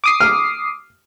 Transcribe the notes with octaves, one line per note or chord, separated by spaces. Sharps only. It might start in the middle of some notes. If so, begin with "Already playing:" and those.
D6 D#6 C7
F6